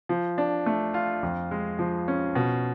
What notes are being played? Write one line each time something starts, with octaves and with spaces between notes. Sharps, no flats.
F3
D4
A3
F4
F2
G#3
F3
C#4
B2